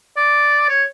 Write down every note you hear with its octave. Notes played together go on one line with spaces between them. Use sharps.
D5
C#5